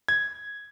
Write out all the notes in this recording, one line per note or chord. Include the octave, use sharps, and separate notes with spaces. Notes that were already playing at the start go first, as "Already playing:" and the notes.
G#6